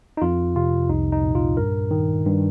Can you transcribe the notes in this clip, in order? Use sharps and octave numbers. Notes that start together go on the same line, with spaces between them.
D#4
F2 F4
C3 F4
C2 D#4
D#4
A#2
F4
G2 A#4
D#3
G2